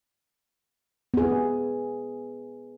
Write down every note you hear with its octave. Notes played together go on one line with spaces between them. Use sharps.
B3 G#4